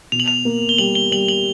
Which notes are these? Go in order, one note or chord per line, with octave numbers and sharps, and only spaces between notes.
B2 F7
F#7
F7
A#3
G7
G3 F#7
G7
G3 F#7
F#7